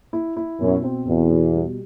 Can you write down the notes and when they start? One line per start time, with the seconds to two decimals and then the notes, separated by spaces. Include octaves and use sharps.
0.13 E4
0.36 E4
0.60 F#2 B2
0.84 C4
1.07 E2 B2
1.30 B2
1.54 G3